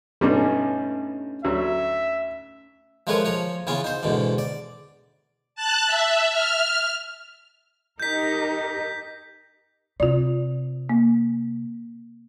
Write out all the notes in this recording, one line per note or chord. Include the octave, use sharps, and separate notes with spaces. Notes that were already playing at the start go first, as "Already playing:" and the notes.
G2 B2 G3 A3 C#4 D#4
D2 F#3 E5
F3 G#3 A3 A#4 B4 C#5
F3 C#5 A#5
C#3 E3 B3 C#4 F4
D#4 C5
E2 G#2 B2 D3
D5
A5 F#6
E5
F6
D#4 G4 A#4 G6 B6
C3 F4 D5
A#3